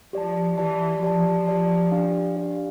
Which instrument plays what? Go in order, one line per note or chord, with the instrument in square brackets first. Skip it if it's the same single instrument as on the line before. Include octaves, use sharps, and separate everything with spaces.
[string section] F3 [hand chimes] G4 D5 A5
[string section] E3 [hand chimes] G4 D5 A5
[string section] F3 [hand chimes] G4 D5 A5
[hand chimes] G4 D5 A5
D4 G4 D5 F5
D4 G4 D5 F5